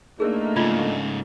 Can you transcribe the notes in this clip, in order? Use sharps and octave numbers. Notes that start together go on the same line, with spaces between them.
A2 A3 A#3 D4 D#4 G#4 A#4
G#2 C#3 F4 D5 B5